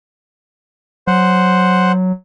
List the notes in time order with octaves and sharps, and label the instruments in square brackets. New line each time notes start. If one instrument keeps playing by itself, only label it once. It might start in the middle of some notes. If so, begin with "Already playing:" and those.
[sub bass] F#3 [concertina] C5 F#5